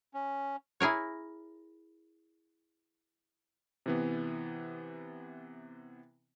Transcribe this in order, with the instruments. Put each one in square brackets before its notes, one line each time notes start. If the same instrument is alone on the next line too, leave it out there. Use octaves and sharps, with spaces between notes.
[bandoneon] C#4
[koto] E4 G#4 A#4 C#5
[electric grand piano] C3 E3 B3